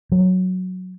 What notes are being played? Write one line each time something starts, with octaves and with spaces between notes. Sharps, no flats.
F#3